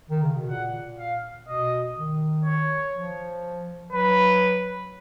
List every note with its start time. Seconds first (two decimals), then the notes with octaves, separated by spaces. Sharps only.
0.10 D#3
0.22 C#3
0.37 B2
0.49 A#2 F#5
0.99 F5
1.48 B2 D#5
1.97 D#3
2.45 C#5
2.94 F3
3.92 F#3 B4